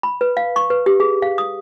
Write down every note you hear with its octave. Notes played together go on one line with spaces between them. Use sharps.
B5
B4
F5
C#6
B4
G4
G#4
F5
D#6